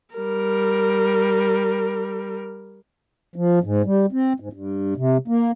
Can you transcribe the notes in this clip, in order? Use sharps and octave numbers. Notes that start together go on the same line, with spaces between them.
G3 A#4
F3
G#2
G3
C4
G#2
G2
C3
A#3